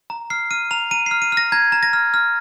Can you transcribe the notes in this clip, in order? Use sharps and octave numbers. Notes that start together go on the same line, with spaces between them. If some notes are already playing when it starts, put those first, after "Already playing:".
A#5
F6 C7
F6 D#7
A#5 F7
A#5 D#7
F6 C7
D#7
F6 A#6
A#5 G#6
A#5
A#6
F6
F6